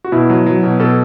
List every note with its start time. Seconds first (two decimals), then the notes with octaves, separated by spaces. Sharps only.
0.05 F#4
0.12 B2 E4
0.30 F#3
0.46 F#3
0.63 B2
0.79 B2 A4